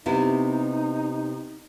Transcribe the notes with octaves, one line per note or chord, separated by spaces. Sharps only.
C3 B3 D#4 E4